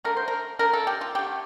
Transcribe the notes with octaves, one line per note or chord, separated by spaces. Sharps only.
D3 A3 A#4
C5
A#4
D3 A3 A#4
A4
G4
F4
D3 A3 G4